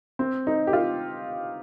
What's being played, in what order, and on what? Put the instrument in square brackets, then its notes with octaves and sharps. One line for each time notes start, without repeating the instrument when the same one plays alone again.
[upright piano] C4
D#4
G4
F4